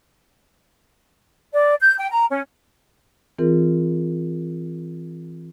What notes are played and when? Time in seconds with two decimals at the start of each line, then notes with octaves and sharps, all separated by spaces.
1.53 D5
1.80 G6
1.98 G5
2.11 A#5
2.30 C#4
3.38 E3 C4 F4 G#4 A#4